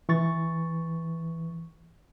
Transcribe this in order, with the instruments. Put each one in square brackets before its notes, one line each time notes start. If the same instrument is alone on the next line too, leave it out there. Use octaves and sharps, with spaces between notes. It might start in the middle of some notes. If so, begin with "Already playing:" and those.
[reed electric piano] E3 C#6 A6